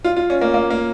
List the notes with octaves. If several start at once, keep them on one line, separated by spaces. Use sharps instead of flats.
F4
F4
C#4
A#3
A#3
A#3